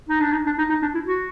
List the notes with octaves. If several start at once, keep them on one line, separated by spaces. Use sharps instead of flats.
D#4
D4
D#4
D4
D#4
D#4
D4
E4
F#4